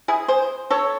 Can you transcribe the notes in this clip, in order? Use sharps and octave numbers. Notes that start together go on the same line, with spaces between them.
E4 G#4
G#4 C5
A4 C#5